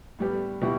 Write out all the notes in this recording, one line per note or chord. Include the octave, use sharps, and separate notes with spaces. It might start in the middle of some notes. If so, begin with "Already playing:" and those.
A2 G3 B3 G4
B2 G3 E4 G4